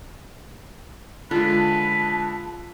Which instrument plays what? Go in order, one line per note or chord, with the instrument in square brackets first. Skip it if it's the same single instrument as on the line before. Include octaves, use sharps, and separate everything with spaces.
[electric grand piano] D3 G#3 [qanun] F4 [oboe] B4 [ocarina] A5